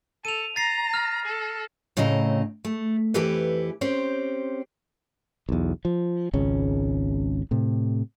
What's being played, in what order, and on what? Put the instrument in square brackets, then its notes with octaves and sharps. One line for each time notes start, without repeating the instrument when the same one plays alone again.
[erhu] A4 [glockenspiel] D#7 F7
[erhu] A#5 [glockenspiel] A6 C7
[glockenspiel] F6 A#6
[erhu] A4
[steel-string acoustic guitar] A2 C#3 A3 C4 D#5 A#5
A3
F2 E3 E4 G4 A4 B4
C4 C#4 G4 C5
[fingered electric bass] B1 E2
F3
G#1 C#2 C#3 C#4
A2 C3